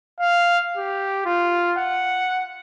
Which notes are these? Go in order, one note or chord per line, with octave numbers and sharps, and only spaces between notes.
F5
G4
F4
F#5